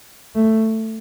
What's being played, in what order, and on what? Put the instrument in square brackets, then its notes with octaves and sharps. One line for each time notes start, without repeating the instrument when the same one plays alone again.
[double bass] A3